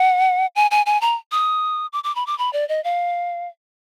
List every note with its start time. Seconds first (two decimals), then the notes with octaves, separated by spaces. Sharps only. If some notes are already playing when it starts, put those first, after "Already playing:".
Already playing: F#5
0.56 G#5
0.71 G#5
0.86 G#5
1.01 A#5
1.32 D#6
1.93 D6
2.04 D6
2.15 B5
2.27 D6
2.38 B5
2.53 D5
2.69 D#5
2.84 F5